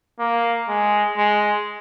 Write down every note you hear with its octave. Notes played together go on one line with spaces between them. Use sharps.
A#3
G#3
G#3